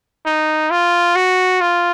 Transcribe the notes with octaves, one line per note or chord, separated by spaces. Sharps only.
D#4
F4
F#4
F4